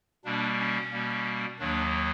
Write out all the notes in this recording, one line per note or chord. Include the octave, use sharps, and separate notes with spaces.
B2 G3 A#3 D4
C#4
B2 G3 A#3
D#2 D#3 F#3 A#3 D4